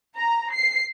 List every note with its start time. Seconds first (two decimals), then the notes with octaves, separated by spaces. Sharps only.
0.17 A#5
0.54 C7